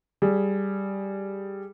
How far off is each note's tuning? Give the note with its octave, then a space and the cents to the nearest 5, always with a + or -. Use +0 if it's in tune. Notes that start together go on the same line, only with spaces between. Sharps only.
G3 +0 G#4 +10